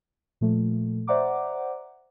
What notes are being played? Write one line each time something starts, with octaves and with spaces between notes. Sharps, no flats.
A#2 F3 A3
C5 D5 E5 F#5 A#5 D6